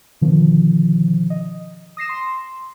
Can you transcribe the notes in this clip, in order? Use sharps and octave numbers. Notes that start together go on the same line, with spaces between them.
B2 D3 D#3 F3
D#5
D#6 A#6 C7 E7
C6